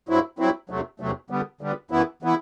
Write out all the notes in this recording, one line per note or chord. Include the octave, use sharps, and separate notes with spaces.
G2 F#3 C4 E4
G2 F#3 C4 E4
E2 C3 F#3 A3
E2 C3 F#3 A3
D3 G3 B3
D3 G3 B3
F#2 E3 B3 E4
E3 B3 E4